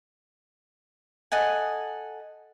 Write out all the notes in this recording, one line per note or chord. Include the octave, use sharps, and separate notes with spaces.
A4 D#5 F#5 G#5